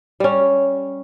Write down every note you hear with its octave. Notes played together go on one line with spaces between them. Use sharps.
G3 C#4